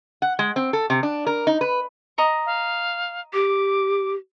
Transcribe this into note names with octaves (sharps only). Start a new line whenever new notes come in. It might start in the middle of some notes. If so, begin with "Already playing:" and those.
F#5
G#3
C4
A4
C3
D4
A#4
D#4
B4
D#5 A#5 C#6
F5
G4 D6